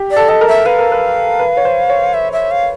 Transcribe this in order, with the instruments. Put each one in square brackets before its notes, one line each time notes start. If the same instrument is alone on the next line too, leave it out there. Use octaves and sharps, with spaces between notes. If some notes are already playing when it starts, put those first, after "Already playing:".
Already playing: [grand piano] G4
[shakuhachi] D5
[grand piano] A4
[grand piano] A4 [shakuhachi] D#5
[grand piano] A#4
[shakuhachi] E5
[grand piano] B4 [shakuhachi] F5
[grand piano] A#4
B4
B4
C#5
C5
C#5
[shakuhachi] E5
E5
F5